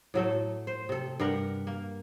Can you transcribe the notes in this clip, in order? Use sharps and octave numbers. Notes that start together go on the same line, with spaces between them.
A2 F#3 A3 A4
C5
C3 A4
G2 G4 A#4 F#5
A#3